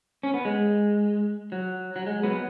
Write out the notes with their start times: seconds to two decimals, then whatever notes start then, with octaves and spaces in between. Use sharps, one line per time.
0.23 C#4
0.34 B3
0.45 G#3
1.52 F#3
1.96 F#3
2.06 G#3
2.23 F#3 B3